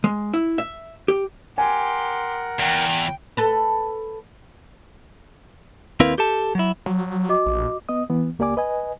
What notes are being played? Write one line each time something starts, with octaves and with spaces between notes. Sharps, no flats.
G#3
E4
E5
G4
G4 A#4 F#5 G#5 C6
E2 G5
A4 B4
D#2 C4 E4 A#4 B4 F5
G4 A4 A5
F#3 E4
F#3
F#4 D#5 D6
A#1
B3 D#5 D#6
E3 B3
C#2 A#3 G4 D5 G#5 D6
B4 D#5 G#5